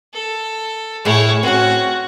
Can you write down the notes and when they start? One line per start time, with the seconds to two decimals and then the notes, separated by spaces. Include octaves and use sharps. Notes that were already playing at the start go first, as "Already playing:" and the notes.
0.14 A4
1.05 A2 E4 G#4 C#5
1.43 C4 C#4 F#4